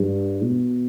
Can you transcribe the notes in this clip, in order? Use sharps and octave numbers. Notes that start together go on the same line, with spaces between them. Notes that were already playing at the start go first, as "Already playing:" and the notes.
Already playing: G2
B2